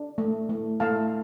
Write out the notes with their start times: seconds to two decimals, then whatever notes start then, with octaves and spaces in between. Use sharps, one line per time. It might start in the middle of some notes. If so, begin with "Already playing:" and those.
Already playing: D4
0.18 A3
0.49 A3
0.80 A3 F5 A5